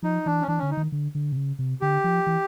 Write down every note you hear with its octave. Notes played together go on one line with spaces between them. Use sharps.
F3 D#4
E3 D4
C#4
E3 D4
D3 C#4
D#4
D#3
D3
D3
C3
C#3
C3
D3 G4
F3
E3